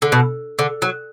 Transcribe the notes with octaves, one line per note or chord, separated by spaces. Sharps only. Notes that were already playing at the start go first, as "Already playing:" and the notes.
D3
B2
D3
F#3